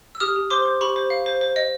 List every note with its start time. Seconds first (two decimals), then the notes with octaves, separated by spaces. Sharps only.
0.15 E6
0.20 G4 D#6 F6
0.36 G4
0.50 C5 C6 D6
0.65 C5
0.81 G4 B5 C#6
0.96 C5
1.10 F5
1.26 C5
1.41 C5
1.56 D#5